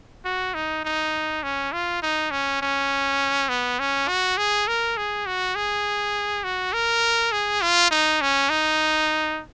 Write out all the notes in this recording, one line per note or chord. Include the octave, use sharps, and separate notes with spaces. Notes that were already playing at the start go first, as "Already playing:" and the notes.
F#4
D#4
D#4
C#4
F4
D#4
C#4
C#4
B3
C#4
F#4
G#4
A#4
G#4
F#4
G#4
F#4
A#4
G#4
F4
D#4
C#4
D#4